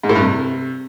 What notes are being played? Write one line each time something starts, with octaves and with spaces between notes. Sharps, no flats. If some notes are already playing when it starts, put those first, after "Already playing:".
G#2
A2
G2
C3